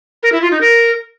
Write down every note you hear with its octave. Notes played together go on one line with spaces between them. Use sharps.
A#4
E4
F4
D#4
A#4